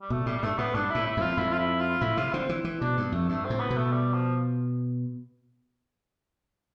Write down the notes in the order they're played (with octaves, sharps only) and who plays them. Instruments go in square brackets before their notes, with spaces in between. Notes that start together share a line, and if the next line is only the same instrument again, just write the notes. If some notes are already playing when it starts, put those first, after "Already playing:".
[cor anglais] G3
[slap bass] B2 [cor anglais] A3
[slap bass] A2 [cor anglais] G3
[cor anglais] G3
[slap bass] G2 [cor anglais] A3
[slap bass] A2 [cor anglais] B3
[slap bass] G2 [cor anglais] D4
[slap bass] A2 [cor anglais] E4
[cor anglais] E4
[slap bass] F2 [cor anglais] F4
[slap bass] F2 [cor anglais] E4
[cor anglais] F4
E4
F4
[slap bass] A2 [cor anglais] E4
[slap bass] C3 [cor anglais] F4
[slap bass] D3 [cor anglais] C4
[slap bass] E3
E3
[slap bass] B2 [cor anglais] D4
[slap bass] G2
[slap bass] F2 [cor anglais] A3
[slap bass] G2 [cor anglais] A3
[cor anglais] C4
[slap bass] A2
[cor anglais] B3
[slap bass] B2
[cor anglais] A3
G3
F3